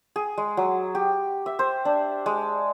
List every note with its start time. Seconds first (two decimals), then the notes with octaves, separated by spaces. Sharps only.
0.16 G#4
0.38 G#3
0.57 F#3
0.95 G4
1.46 E5
1.59 C5
1.85 D4
2.26 G#3